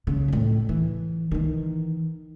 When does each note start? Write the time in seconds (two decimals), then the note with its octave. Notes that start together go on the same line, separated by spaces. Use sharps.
0.07 C#3
0.28 F2 A2
0.69 E3
1.31 D#3 E3